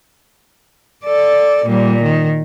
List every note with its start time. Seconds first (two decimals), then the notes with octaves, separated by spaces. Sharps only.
1.05 A4 D5
1.65 A#2 G3
2.03 D#3